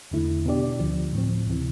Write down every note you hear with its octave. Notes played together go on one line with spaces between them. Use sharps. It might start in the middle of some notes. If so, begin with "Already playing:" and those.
E2 D3 A3 E4
B2 B3 D4 G4 D5
D2 D3 F3
A2 F3 C4
D2 C3 E3